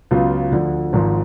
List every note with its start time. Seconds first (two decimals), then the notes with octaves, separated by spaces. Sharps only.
0.11 C#2 C#3 F#3 B3 F4
0.51 D2 D3 F3
0.93 G#1 G#2 F3